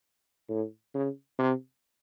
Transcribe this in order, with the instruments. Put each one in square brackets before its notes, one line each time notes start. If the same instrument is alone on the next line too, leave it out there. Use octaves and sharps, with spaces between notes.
[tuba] A2
C#3
C3